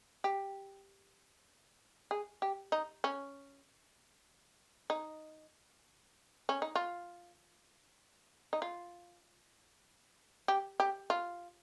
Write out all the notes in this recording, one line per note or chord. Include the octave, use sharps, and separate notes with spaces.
G4
G#4
G4
D#4
C#4
D#4
C#4
D#4
F4
D#4
F4
G4
G4
F4